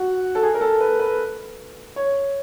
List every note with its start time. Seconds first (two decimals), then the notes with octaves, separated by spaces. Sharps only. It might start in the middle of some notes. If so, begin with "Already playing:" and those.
Already playing: F#4
0.35 A4
0.43 G#4
0.54 A#4
0.61 A4
0.81 B4
1.00 B4
1.96 C#5